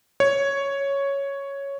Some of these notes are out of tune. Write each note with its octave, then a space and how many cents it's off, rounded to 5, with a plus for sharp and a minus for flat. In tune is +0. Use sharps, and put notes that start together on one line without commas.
C#5 +0